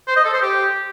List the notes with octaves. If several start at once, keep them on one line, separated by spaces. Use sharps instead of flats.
C5
D#5
A4
C5
G4